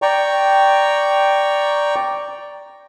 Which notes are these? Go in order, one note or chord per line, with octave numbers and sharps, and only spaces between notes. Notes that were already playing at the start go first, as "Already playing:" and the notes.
D5 G5 A#5 C#6